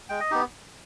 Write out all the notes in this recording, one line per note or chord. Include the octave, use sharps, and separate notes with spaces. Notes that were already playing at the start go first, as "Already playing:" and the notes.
G#3 G5
D#5
B3 D#4 G4